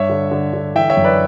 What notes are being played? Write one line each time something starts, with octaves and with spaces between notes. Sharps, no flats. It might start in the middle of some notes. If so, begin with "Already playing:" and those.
Already playing: G2 C#5 E5
D3
D3
D3
E3 E5 G5
C#5 E5
F#2
B4 D5